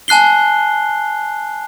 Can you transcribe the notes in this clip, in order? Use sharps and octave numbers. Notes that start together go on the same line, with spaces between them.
G#5 A5 F#6 C7 G7